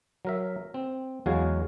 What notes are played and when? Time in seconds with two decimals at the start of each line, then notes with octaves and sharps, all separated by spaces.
0.25 F#3 A#4 E5
0.74 C4
1.26 E2 F#3 G#3 F#4 F5 G#5